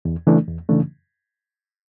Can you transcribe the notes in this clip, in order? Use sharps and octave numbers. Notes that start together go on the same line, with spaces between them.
E2
C#3 E3 A3 D4
E2
C#3 E3 A3 D4